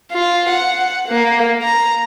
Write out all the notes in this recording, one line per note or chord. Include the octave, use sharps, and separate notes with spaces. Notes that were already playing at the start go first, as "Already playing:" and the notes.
F4
F#5
A#3
A#5